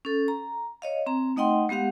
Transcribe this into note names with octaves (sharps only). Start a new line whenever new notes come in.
C#4 A4
A#5
C#5 D#5 F5
C4 A#5
A3 D#4 D#5 F#5 G5 C6
G#3 B3 G4 F5 F#5